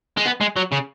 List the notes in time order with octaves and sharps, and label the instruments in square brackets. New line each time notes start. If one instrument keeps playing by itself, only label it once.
[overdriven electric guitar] G#3
B3
G#3
F#3
C#3